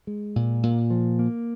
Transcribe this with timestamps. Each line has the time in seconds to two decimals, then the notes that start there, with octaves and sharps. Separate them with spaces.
0.07 G#3
0.36 A#2
0.63 A#2
0.90 F3
1.19 A#3